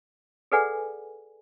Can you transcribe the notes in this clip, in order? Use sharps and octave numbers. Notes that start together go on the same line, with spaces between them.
G#4 A4 B4 D5 F#5 G#5